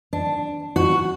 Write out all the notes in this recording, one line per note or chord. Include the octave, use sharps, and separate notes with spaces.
D4
F#4